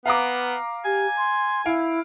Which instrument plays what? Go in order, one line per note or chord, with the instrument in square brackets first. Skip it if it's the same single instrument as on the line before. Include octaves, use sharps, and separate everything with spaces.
[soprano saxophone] B3 [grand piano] F5 A#5 D6
[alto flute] G4 [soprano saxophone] G#5
[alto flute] C6
[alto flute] E4 [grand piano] F5 D7